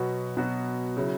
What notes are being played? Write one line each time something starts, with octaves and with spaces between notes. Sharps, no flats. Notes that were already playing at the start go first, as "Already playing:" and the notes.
Already playing: B2 F#3 B3 F#4 B4
B2 F#3 B3 F#4 B4
C#3 F#3 E4